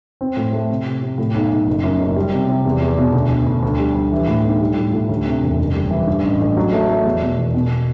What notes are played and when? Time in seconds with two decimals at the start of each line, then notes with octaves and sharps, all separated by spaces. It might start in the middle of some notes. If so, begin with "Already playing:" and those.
0.21 C4
0.37 A2
0.53 A3
0.70 C3
0.86 C3
1.02 C3
1.18 A2
1.34 B1
1.51 B1
1.67 F#1
1.84 F#2
2.00 F#1
2.16 G3
2.32 C3
2.48 C3
2.65 E2
2.82 E2
2.98 B2
3.13 D2
3.30 D2
3.47 D2
3.63 D2
3.79 G3
3.95 D2
4.12 E3
4.28 A2
4.45 B1
4.60 G3
4.77 A2
4.93 A2
5.09 D2
5.26 C3
5.42 E1
5.58 F#1
5.75 G3
5.91 E3
6.07 G2
6.24 A1
6.40 A1
6.57 F#3
6.73 A3
6.89 A3
7.05 E2
7.22 B2
7.38 E1
7.54 B2